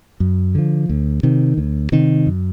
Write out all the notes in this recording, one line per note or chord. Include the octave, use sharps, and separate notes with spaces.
F#2
D3 F3
D2
C3 D#3
D2
C3 D#3
F#2